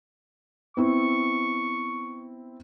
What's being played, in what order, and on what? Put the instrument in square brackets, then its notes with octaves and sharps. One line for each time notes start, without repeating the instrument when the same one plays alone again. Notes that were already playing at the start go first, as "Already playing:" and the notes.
[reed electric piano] B3 [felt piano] C4 E4 [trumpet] C#6